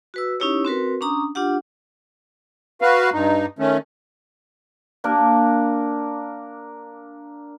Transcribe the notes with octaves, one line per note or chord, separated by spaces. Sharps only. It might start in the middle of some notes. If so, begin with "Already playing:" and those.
F#4 B4 E6
C#4 D#4 E4 G4 C#5
C4 F#4 A#4 B4
C#4 D4 A#5 D#6
D4 F4 G4 F#5
F#4 B4 F5
G2 D#4
D#3 A3 C#4
A#3 D4 A#4